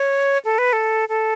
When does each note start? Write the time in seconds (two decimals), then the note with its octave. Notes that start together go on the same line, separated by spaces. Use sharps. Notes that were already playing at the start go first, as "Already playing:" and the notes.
Already playing: C#5
0.45 A4
0.58 B4
0.73 A4
1.09 A4